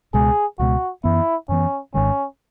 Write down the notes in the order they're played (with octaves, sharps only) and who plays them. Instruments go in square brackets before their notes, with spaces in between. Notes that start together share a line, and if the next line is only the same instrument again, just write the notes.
[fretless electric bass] C#2 B2 G#3 [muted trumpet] G#4
[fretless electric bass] C#2 B2 G#3 [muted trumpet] F#4
[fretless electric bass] F#2 E3 B3 [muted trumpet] E4
[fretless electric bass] F#2 E3 B3 [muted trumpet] C#4
[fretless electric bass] G#1 G#2 D#3 G#3 [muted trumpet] C#4